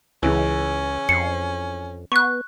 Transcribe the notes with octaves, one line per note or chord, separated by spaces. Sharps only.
C#2 C#3 E3 C#4
F2 C7 C#7
B3 C#6 F#6